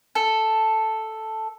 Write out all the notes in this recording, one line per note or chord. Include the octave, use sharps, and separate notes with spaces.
A4